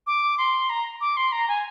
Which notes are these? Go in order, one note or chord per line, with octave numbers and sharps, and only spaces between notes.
D6
C6
A#5
D6
C6
A#5
G#5